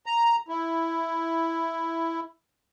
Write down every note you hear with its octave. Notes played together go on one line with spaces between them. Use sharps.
A#5
E4